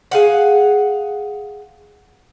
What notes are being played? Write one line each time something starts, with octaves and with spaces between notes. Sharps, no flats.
G#4 F5 F#5